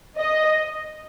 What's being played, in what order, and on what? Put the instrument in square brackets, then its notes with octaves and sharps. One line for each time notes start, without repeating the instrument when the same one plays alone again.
[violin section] D#5